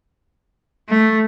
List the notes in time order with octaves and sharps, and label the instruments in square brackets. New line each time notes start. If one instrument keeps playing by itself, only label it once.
[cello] A3